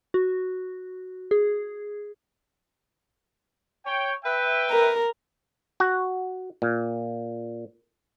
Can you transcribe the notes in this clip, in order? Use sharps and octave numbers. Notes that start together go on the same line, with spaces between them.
F#4
G#4
C#5 G5
B4 E5 G5
A#4
F#4
A#2